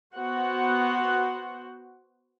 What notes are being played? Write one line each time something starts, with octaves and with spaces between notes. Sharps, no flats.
B3 F#4 C5 F#5